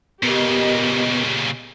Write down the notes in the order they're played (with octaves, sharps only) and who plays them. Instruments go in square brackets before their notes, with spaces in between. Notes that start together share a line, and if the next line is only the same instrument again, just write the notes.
[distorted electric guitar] A#2 C#3 [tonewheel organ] B3 [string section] G4 A#4 D#5